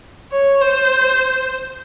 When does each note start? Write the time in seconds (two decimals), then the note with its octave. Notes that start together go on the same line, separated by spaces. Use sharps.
0.32 C#5
0.61 C5